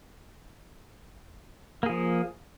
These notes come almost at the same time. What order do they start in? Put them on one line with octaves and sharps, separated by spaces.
A#3 G#4 F3